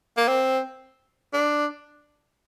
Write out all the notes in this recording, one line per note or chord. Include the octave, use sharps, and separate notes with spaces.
A#3
C4
D4